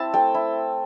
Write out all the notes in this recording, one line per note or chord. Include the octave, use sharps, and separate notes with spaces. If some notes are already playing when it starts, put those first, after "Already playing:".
Already playing: C4 E4 A5
A3 G5
E4